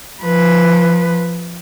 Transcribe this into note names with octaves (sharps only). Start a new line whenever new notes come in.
F3 B4